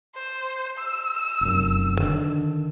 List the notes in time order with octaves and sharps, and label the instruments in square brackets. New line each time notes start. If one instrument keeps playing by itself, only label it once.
[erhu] C5
E6
[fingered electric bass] F1 F#2
D3 D#3 D4